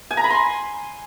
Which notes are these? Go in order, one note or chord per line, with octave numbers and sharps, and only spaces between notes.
G#5
A#5
B5
C6